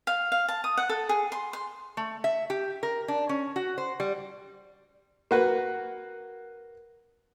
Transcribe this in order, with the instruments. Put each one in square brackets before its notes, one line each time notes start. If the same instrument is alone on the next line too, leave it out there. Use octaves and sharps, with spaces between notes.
[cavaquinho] F5
F5
A5
D#6
F#5
A4
G#4
C6
C6
[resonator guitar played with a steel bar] A3
E5
G4
A#4
D4
C#4
F#4
C5
G3
[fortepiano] A#3 F#4 B4